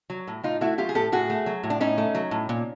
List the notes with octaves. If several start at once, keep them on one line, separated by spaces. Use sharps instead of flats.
F#3
A2
A2 D#4 F4
A3 E4 F#4
F#3 F4 G4
G#4
A2 G4 A4
A2 F#4 G#4
A3
F#3
A2
D4
A2 C#4 D#4
A3
F#3
A2
A#2